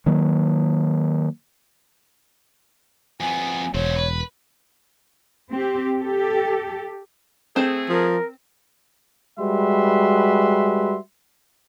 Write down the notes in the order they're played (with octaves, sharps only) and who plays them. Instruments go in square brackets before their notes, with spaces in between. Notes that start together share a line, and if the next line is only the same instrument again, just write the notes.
[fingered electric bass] D#3 F#3 A#3
[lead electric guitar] F2 B3 [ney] G#5
[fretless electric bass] E1 [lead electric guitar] F#3 C5 [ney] C#5
[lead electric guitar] B4
[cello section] C4 G4
G4 A4
[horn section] A3 G#4 [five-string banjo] C4 C5
[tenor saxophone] F3 [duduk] A#4
[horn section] G3 G#3 F#4 B4 E5 C6